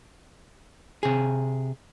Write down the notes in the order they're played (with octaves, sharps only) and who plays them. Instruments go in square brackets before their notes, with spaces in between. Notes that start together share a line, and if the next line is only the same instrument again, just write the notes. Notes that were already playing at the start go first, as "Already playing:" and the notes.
[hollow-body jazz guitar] C3 G#4